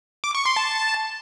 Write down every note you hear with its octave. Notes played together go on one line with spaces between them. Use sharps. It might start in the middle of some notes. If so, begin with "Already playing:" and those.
D6
C#6
C6
A5